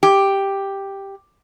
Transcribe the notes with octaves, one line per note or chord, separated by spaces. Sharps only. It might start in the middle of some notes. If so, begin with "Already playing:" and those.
G4